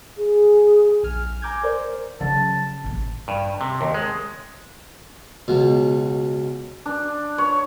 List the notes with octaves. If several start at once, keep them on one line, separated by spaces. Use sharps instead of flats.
G#4
A#1 G#5 F6
G#5 A#5 D6 G6 G#6
A#4 C5 D5
C#3 F#3 A5
A1 A#2
G2
C3
D#2
G#3
C#2 B2
D4
C#5